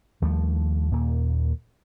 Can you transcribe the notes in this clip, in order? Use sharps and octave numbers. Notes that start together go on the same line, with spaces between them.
D#2 F3 G3 A3
D#2 A#2 A#3